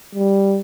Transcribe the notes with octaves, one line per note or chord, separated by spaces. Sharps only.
G3